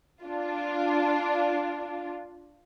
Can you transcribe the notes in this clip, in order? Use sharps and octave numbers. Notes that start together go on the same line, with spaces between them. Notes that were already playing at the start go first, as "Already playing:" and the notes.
D4 F4